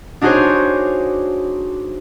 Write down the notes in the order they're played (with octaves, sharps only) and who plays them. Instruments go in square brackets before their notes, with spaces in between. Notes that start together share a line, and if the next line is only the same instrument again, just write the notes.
[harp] D4 D#4 F#4 G#4 C5 C#5